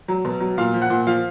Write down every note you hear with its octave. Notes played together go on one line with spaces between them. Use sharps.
F#3
B2
F#3
A#2 F5
F3
F#5
A#2
F3 F5